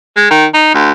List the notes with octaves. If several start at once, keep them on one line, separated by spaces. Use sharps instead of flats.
G#3
D#3
D#4
D2